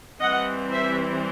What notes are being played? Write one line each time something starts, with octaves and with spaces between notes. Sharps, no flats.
E3 G3 C4 D#5 F#5
C5 E5